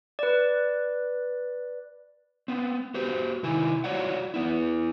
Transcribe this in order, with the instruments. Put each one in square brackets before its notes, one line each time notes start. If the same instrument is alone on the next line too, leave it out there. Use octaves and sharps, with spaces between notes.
[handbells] B4 D5
[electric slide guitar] B3 C4
F#4 G4 C5
C3 D#3 E4 G#5
F4 F#4 C#5 D5 F#5
E3 B3 E4